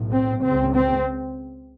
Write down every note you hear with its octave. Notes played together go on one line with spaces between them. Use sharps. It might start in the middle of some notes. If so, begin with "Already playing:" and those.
Already playing: B1 A2
C4
C#2 C#3 C4
C4